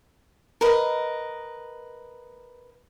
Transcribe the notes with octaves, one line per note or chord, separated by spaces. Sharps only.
A#4 B4 D#5